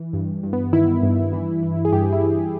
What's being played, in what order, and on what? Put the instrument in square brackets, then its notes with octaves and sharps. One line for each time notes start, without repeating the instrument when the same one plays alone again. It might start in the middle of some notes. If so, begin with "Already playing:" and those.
Already playing: [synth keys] E3
G2
G2
B3
D#3 E4
G2
E3
E3
G#4
G2 G4
E4
E3